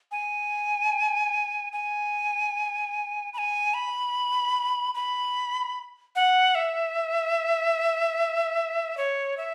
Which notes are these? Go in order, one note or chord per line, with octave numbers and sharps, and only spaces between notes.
G#5
G#5
B5
G#5
B5
B5
F#5
E5
C#5
E5